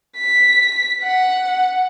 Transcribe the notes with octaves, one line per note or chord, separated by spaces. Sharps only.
B6
F#5